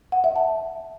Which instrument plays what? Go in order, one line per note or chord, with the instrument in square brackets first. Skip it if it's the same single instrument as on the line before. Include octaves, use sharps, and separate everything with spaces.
[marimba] F#5
E5
A5